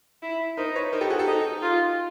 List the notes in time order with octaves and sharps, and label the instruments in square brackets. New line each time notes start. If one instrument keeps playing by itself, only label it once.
[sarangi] E4
[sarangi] D#4 [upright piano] A#4 C5
[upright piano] B4 C#5
[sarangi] D#4 [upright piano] A#4 C5
[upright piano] G4 A4
F#4 G#4
G4 A4
[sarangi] D#4
F4